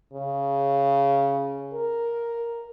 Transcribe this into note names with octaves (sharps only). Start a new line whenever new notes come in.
C#3
A#4